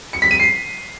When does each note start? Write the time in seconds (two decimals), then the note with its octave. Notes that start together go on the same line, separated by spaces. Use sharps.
0.13 C#7
0.22 B6
0.31 D#7
0.40 C7